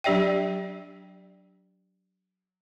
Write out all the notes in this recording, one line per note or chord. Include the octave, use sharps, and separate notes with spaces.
F#3 D4 G4 D5 E5 G5